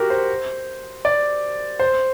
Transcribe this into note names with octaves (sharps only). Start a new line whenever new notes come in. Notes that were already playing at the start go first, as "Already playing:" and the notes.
Already playing: F#4 G4 A#4
C5
D5
C5